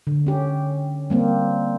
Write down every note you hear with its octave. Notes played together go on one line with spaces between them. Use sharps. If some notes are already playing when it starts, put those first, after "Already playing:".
D3
C#4 G4
G3 A#3 C4